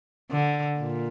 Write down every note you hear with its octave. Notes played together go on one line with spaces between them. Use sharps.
D3
A#2